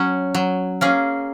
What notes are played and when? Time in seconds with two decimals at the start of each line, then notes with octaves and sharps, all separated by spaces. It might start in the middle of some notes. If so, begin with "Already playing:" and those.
Already playing: F#3 C#4
0.34 F#3
0.81 A#3 C#4 G#4